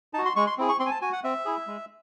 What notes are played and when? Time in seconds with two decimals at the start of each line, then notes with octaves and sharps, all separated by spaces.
0.14 D#4 A5
0.18 F#4
0.25 C6
0.36 G#3 C#6
0.47 C6
0.58 C4 E4 G#4
0.69 C#6
0.79 C4 C6
0.86 G#5
0.91 A5
1.02 F#4 G#5
1.12 F#5
1.24 C4 E5
1.45 E4 G#4
1.67 G#3